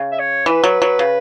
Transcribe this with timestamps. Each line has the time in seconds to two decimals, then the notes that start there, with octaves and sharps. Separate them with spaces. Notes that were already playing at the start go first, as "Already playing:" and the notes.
Already playing: C#3
0.12 E5
0.19 C#5
0.46 E3 B4
0.64 F#3
0.82 F#3
0.99 C#3